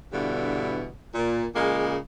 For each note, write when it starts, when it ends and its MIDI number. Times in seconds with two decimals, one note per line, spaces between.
0.12 0.88 43
0.12 0.88 47
0.12 0.88 50
0.12 0.88 52
1.15 1.44 46
1.55 1.96 46
1.55 1.96 49
1.55 1.96 56
1.55 1.96 58